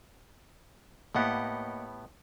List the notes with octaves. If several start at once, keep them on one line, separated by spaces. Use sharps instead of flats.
A2 A#3 B3 G4 D#5 F#5